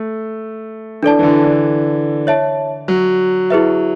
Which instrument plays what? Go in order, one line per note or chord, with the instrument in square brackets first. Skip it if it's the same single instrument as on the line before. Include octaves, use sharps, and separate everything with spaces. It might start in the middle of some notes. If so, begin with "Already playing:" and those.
Already playing: [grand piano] A3
[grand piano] E3 [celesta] D4 A4 D5 A5
[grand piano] E3
D3
D3
[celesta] C#5 E5 A5
[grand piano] F#3
[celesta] E4 G#4 B4 E5